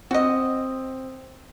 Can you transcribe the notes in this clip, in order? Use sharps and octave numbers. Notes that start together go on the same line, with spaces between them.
C4 F#4 D#5